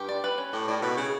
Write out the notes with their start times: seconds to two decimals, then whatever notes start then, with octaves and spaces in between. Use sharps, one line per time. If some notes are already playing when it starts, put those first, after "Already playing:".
Already playing: G2 G4
0.09 D5
0.24 B4
0.38 C#4
0.53 A2 G4
0.68 A2 D5
0.82 B2 B4
0.97 C#3 C#4